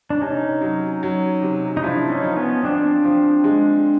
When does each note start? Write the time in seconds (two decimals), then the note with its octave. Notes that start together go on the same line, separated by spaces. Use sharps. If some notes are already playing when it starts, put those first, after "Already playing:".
0.10 D4
0.21 C3 C#4 D#4
0.62 F#3
1.03 F#3
1.42 C3
1.77 D#4
1.83 F3 D4 E4
2.10 C#4 D#4
2.23 F3
2.37 B3 C#4
2.63 F3 C4 D4
3.05 F3
3.44 G#3